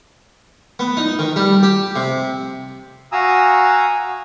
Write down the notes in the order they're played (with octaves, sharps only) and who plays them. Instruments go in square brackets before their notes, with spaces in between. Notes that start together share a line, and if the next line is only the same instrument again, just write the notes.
[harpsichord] B3
D#4
D#3
G3
G4
C3
[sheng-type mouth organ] F#4 F5 G#5 A#5 D#6 E6